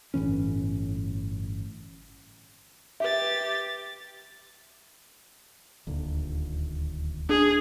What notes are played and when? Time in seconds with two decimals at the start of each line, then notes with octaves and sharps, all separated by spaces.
0.14 G1 A2 E3 C#4
3.00 G4 B4 E5 A6
5.87 D#1 D2
7.29 D4 G#4